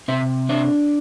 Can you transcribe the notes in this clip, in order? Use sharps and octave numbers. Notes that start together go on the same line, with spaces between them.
C3 C5 E5
D4 C5 E5